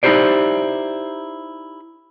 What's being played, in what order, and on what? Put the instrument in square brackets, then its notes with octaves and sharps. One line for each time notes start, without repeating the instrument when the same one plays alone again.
[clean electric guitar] D#4 E4 F#4 G4 C5 D5